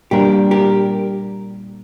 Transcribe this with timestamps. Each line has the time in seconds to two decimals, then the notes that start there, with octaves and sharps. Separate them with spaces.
0.11 A#2 G3 D4 G4 A#4
0.51 G4 A#4